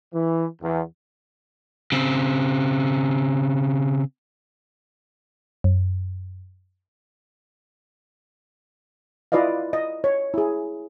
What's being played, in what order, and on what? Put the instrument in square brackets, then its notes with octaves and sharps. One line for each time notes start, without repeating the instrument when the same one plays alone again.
[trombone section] E3
E2
[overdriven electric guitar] C#3 C4
[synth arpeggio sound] F#2
[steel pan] E4 F4 B4 D5 D#5 F5
D#5
C#5
E4 G#4